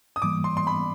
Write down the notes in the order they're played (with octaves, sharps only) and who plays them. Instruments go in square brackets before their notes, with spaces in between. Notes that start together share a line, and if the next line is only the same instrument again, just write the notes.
[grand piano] D#6
[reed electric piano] G#2 E3 G3 A#3 [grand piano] D6
[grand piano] C6
C6
B5